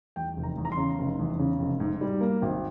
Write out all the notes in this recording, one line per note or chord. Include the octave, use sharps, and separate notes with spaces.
E2 G5
F1
A#5
E2
A#5
C6
C#3
F1
E2
C#3
F1
G#2
G3
A#3
G#1